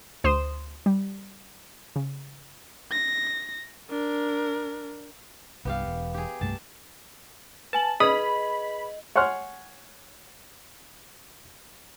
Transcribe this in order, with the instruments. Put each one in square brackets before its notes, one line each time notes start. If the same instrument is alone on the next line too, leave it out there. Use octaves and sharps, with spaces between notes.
[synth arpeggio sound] D2 C5 C6 D#6 E7
G3
C#3
[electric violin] A#6
D4 A#4
[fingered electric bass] C2 G2 [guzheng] B3 G4 F5
[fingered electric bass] E1
[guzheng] G4 G#4
[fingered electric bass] C2 G2 A3 [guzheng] A5
[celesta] B4 G#5 F#7 [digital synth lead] A5
[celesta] G#4 B4 [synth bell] D#5 [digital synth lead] B5 [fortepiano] D#6
[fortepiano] C#5 F#5 G#5 C6 F6